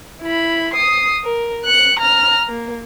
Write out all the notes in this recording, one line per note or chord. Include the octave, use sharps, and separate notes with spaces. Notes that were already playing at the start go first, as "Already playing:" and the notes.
E4 B5
D#6 C7
A#4
F#6 C#7
A#5 F6
A#3